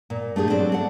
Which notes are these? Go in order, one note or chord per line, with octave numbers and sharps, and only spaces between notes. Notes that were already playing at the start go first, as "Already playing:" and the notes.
A#2
A3 D4 G4 G#4
F#3 C4 D4 A4 D5
D4 F#5